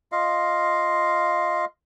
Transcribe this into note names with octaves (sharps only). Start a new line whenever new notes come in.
F4 D#5 F5